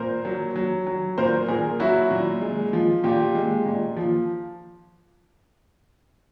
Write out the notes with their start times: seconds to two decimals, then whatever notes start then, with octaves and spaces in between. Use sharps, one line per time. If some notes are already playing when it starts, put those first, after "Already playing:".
Already playing: A#2 A#4 C5
0.25 F#3
0.56 F#3
0.87 F#3
1.18 A#2 A#4 C5
1.48 A#2 G#4 A#4
1.80 F#3 E4 F#4
2.10 A#2
2.41 G#3
2.73 F3
3.04 A#2 F4 G4
3.35 G#3
3.66 A#2
3.97 F3